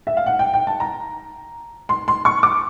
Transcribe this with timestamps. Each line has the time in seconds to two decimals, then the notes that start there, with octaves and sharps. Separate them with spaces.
0.07 E5
0.17 F5
0.26 F#5
0.39 G5
0.54 G5
0.67 A5
0.80 A#5
1.89 C6
2.08 C6
2.25 C#6
2.43 D6